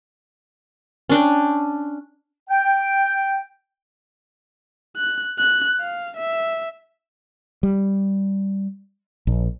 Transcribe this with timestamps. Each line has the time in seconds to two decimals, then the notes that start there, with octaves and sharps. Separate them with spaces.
1.09 C#4 D4 G5
2.49 G5
4.96 F#6
5.38 F#6
5.81 F5
6.17 E5
7.63 G3
9.27 A#1